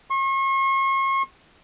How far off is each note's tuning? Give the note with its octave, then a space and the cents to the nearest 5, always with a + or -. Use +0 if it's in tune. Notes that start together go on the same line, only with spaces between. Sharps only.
C#6 -45